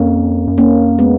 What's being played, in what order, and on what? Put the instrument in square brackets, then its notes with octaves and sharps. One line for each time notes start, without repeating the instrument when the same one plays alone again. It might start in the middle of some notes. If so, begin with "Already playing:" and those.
Already playing: [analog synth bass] F2 [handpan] A#3 C#4
[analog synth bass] F#2
[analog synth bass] F2 [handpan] A#3 C#4
[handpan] G#3 B3